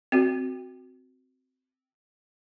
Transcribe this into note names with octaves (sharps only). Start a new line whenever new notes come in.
C4 F#4